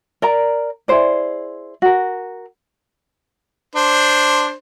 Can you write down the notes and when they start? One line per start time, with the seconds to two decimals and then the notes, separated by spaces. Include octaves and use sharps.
0.22 A#4 D5 A#5
0.88 E4 G#4 C5 D5
1.82 F#4 A#4
3.76 D4 C5